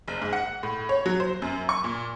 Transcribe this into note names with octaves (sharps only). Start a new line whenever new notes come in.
F#1
G#2
F#5
A2
C#5
F#3
C5
F#2
C#6
A#2